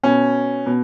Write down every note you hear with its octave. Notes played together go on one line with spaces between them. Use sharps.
B2 C#4
B2